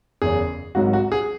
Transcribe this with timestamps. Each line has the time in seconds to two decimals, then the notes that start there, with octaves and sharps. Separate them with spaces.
0.22 F#1 E2 C#3 G#4
0.75 G#1 G#2 F#3 F#4
0.93 F#4
1.12 G#4